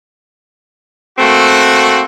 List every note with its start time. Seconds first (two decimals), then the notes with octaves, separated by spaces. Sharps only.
1.18 A3 A#3 C4 F#4